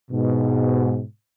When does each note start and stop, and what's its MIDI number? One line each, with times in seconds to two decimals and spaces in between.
0.11 1.01 44
0.11 1.01 47